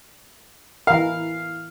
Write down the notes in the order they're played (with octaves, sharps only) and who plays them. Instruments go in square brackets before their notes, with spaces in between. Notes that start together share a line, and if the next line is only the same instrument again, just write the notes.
[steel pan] E3 A#4 [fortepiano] F5